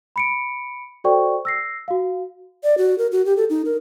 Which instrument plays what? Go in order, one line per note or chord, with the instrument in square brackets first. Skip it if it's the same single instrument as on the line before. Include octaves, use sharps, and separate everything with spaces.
[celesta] B5 C#7 D7
F#4 A4 C5 D5 G5 C#6
E6 A#6 C7
F#4 F5
[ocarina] D5
F#4
A#4
F#4
G4
A4
D#4
A#4